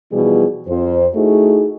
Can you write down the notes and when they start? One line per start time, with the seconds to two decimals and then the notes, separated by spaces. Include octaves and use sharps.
0.12 B2 E3 F3 G3 F4 G#4
0.68 F2 C5
1.15 A3 D#4 E4 F#4 G#4